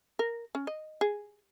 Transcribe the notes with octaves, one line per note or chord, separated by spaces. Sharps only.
A#4
C#4
D#5
G#4